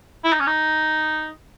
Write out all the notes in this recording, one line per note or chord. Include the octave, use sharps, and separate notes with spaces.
E4
D#4
C#4
D#4